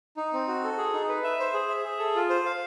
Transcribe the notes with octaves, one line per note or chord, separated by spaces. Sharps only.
D#4
C4
F#4
A4
G#4
D#4
B4
E5
C5
G#4
E5
G#4
A4
F4
C5
F5